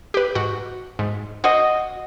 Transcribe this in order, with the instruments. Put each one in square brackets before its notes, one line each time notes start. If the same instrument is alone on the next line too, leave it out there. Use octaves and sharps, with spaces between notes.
[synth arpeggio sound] G4 B4
G#2 F#4
G#2
[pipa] F#4 D#5 [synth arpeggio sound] C5